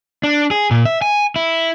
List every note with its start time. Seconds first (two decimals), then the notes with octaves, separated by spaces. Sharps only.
0.23 D4
0.51 G#4
0.71 A#2
0.85 E5
1.02 G#5
1.36 E4